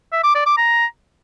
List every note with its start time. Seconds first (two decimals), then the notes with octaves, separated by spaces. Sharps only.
0.12 E5
0.24 D6
0.35 D5
0.46 D6
0.57 A#5